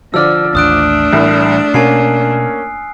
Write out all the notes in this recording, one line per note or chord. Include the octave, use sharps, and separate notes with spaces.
D3 F3 D5 E6 F6
A1 D#2 A3 D4 D#6 F#6 D7
C2 A2 E3 G3
B2 A#3 C#4 G#5 C7